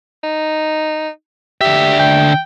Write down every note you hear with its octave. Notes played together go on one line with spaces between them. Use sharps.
D#4
D3 G4 E5
G5